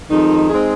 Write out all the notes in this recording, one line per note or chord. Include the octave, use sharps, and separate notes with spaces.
F2 D#3 G#3 D#4
G#3 C4 D#4 G#4